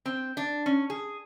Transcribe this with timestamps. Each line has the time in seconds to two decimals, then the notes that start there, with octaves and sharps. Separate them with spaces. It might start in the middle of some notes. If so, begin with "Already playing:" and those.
0.06 C4
0.37 D4
0.66 C#4
0.90 G#4